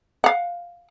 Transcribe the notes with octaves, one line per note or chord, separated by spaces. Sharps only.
F5 F#5